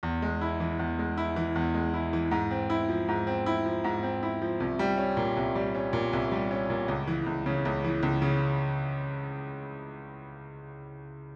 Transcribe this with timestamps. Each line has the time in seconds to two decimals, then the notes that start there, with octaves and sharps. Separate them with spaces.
0.03 E2
0.22 G#3
0.41 E4
0.60 E3
0.79 E2
0.99 G#3
1.17 E4
1.36 E3
1.55 E2
1.74 G#3
1.94 E4
2.13 E3
2.31 G#2
2.51 C4
2.70 E4
2.89 F3
3.09 G#2
3.27 C4
3.46 E4
3.65 F3
3.84 G#2
4.03 C4
4.23 E4
4.42 F3
4.60 C2
4.79 G3
4.98 C#4
5.17 A#2
5.37 C2
5.55 G3
5.75 C#4
5.93 A#2
6.13 C2
6.32 G3
6.51 C#4
6.70 A#2
6.88 C#2
7.08 E3
7.26 C#2
7.46 C#3
7.65 C#2
7.84 E3
8.03 C#2
8.22 C#3